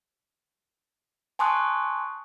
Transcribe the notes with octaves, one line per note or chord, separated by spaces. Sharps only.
G#5 A5 C6 C#6 D#6 F#6